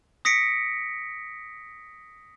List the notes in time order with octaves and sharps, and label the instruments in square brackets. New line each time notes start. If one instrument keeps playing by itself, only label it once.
[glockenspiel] D#6 A#6 B6 C#7 D7